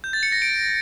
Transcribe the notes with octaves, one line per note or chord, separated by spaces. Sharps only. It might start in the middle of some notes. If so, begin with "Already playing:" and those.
G6
A6
C#7
A#6
D7